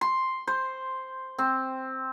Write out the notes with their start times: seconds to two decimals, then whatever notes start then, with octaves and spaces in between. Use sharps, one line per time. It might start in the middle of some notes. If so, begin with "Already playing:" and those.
0.01 C6
0.47 C5
1.38 C4